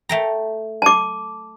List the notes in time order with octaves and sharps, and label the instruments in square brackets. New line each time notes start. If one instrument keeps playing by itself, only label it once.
[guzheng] A3 G5 A#5
[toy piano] A5 D6